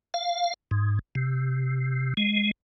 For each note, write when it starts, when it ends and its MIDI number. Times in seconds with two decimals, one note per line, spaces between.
0.14 0.54 77
0.71 0.99 44
1.15 2.14 48
2.17 2.51 56